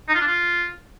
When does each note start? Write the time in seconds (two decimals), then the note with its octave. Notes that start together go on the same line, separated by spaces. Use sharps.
0.08 D#4
0.15 F4
0.21 D4
0.27 F4